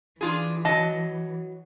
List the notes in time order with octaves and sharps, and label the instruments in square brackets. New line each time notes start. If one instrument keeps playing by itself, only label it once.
[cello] E3 [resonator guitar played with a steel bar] D4 F4 G#4
[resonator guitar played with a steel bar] F#3 D#5 A5